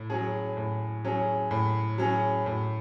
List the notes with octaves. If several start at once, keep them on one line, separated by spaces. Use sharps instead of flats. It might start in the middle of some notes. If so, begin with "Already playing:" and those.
Already playing: A2
F#3 C#4 G#4
A2
F#3 C#4 G#4
A2
F#3 C#4 G#4
A2